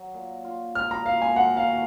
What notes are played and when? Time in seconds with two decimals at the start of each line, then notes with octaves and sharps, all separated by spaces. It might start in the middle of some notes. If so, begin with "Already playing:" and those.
Already playing: F#3
0.14 A#2
0.45 F4
0.75 D#4 F6
0.91 A#5
1.06 A#3 F5
1.22 G#5
1.36 D#3 F#5
1.57 F5
1.67 F#4